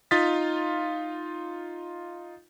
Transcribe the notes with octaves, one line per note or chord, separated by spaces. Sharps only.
D#4 F4 F5 D#6 A6 B6